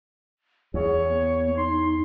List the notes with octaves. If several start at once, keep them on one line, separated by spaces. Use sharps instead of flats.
E2 G#4 C#5
B3
D#4 C6